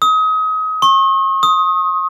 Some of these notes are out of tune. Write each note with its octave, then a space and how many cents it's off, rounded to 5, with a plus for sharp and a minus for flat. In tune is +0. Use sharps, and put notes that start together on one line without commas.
D#6 +30
C#6 -45
D#6 +15